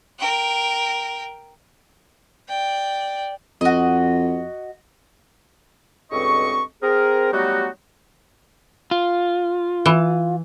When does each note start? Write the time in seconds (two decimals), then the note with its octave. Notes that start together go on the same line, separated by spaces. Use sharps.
0.19 A#4 G5
2.49 D5 G5
3.61 F2 F#4 D#5
6.11 C#2 G2 C4 A4 D#5 C#6
6.82 C4 G#4 A#4
7.33 F#3 G3 A3 B3 D#4 F#4
8.91 F4
9.86 E3